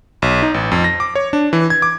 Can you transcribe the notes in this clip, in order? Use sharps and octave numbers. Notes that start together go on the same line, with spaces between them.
B1
D#4
A1
F2
A#6
D6
C#5
D4
E3
G#6
D6